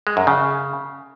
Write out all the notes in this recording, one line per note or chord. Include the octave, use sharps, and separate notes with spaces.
G#3
F#2
C#3